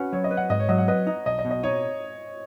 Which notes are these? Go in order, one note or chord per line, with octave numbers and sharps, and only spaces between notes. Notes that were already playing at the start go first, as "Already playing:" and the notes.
Already playing: C#4 F#4 B4
F#3 C#5
D#5
B4
F#5
G#2 D#5
C#5
F#3 D#5
F#5
B4 D#5
D#4
B1 D#5
D#5
B2
D#5
D#4 C#5